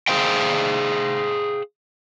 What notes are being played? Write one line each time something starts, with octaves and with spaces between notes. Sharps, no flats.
G#4 A4 C5 F5 G5